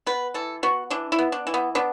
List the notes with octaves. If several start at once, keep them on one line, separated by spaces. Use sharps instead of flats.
B3 B4
E3 A4
B3 F#4
E3 D4
E4
B3
D4
E3
B3
B3 D4